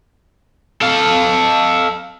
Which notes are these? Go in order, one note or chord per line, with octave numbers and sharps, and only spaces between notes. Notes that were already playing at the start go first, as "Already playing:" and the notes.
A4 F5